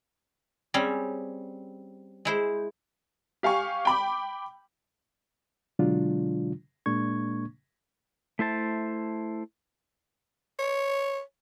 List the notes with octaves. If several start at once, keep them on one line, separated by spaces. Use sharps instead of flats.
G3 C4 C#4 G#4
G#3 E4 C5
G4 F5 G#5 C#6
G5 B5 D6
B2 D3 F#3 G#3 D4 F4
A#2 G#3 A#3 D4 C#6 G#6
A3 E4 C5 A5
C#5